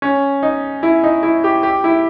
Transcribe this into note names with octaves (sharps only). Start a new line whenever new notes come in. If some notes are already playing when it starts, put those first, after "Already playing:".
C#4
D#4
E4
D#4
E4
G4
G4
E4